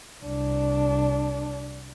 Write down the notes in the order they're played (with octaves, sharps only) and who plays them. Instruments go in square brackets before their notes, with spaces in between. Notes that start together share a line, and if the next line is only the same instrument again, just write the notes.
[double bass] C2 D4